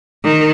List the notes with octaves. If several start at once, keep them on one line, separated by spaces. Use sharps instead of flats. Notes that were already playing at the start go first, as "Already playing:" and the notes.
D#3